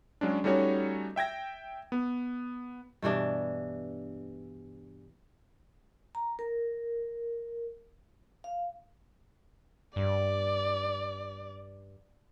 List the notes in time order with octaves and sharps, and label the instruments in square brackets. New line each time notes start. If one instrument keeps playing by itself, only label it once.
[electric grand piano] F#3 G#3 C#4 D4
G3 A3 C#4 D#4 F#4 C#5
E5 G5 G#6 A#6
B3
[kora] G2 B2 E3 D4
[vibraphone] A#5
A#4
F5
[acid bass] G2 [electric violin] D5